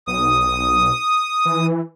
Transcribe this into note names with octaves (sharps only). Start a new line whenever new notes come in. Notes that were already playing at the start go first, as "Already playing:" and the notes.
B1 D#6
E3